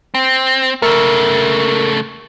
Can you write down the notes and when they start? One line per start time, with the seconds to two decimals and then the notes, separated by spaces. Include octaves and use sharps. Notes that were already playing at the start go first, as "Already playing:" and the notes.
0.15 C4
0.82 C#3 A3 A#4 E6